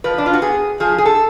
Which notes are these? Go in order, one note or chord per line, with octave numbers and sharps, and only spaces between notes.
F3 B4
D4
F4
F#4
B3 G#4
F3 G#4
G#4
A4